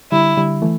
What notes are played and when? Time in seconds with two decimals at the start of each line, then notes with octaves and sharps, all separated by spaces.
0.11 D3 G3 E4
0.37 D3 G3
0.62 E3 A3